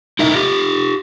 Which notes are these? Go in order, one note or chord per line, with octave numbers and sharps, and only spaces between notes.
D#4 E4 A#4 D#5 E5
F4 G4